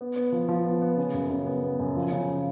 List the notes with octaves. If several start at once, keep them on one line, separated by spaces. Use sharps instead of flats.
B3
B3
F3
F3
B3
B3
C#3
F#2
C#3
B3
B3
F#2
F3
C#3